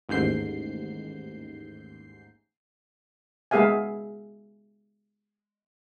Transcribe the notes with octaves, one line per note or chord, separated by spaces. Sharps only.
A1 D#2 G#2 G6 C7
G#3 B3 G#4 E5 F5 G#5